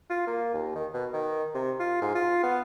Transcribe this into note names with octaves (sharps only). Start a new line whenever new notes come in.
F4
A#3
D#2
D#3
B2
D#3
C3
F4
G#2
F4
B3